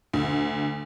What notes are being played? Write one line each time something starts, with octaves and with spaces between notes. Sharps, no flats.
D2